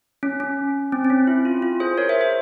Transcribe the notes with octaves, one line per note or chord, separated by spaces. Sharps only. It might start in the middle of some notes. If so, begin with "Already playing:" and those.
C#4
C#4
C4
C4
C#4
E4
F4
F4
G#4 C5
A#4 C#5
C5 E5
C5 E5